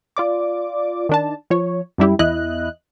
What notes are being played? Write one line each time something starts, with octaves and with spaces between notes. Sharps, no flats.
F4 D5 D6
D#3 D4 A5
F3 C#5
F#2 G3 E4 G4
E2 E4 D#5 F#6